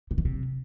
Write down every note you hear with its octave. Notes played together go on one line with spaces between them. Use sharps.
C#3
D#3
C3